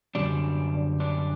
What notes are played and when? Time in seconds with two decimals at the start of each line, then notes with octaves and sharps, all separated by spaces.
0.15 F#2 D3 G3 D4
1.00 D4